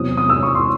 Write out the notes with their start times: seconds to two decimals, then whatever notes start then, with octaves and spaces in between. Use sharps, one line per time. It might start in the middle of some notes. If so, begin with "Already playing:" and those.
Already playing: E2 C3 F#3 C4 D#6
0.17 D#6
0.30 E6
0.43 C#6
0.55 C6